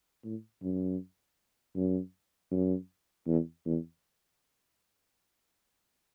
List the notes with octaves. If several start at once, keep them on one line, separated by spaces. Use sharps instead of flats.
A2
F#2
F#2
F#2
E2
E2